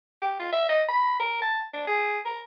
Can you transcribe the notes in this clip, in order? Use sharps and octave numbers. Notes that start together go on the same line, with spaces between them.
G4
F4
E5
D#5
B5
A#4
A5
D4
G#4
A#4